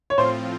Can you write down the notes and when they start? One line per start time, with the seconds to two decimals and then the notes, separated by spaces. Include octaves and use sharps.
0.10 C#5
0.18 A2 F3 C4 F4 C5